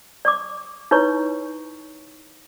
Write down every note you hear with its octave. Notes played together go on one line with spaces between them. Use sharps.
D5 C#6 D6
D#4 E4 B4 C#5 C#6